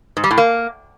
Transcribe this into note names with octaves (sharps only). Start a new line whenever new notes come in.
G#2
G3
A2
A#3